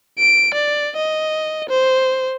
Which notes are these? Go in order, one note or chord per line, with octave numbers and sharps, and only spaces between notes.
D7
D5
D#5
C5